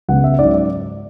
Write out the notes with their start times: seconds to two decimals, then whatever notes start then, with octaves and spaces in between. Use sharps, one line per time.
0.08 C#2 C#3 G#3 B3 F#5
0.24 E5
0.39 G#2 F#3 C#4 D5
0.54 D5